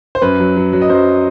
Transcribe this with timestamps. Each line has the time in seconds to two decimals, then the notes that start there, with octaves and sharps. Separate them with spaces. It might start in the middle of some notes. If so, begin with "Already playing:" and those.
0.15 C5
0.22 F#2 B4
0.40 F#3
0.56 F#3
0.73 F#3
0.82 D#5
0.90 F#2 C5